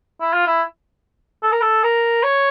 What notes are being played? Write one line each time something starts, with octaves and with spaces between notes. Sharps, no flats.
E4
F4
E4
A4
A#4
A4
A#4
C#5